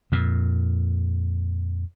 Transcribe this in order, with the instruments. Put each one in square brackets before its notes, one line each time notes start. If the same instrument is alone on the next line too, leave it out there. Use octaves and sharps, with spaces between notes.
[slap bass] F2 A#2